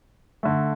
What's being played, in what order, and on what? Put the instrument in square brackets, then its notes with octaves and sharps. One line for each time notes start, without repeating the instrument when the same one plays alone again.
[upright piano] D3 A3